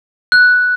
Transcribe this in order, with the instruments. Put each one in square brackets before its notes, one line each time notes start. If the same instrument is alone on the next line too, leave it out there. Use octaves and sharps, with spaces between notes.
[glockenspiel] F#6